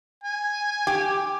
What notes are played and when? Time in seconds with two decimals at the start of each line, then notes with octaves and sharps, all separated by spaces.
0.24 G#5
0.87 G4